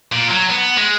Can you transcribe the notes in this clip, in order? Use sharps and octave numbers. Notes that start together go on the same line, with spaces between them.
A#2
F#3
B3
G#3